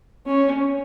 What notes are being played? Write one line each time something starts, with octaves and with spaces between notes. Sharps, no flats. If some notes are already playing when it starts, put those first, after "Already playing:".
C#4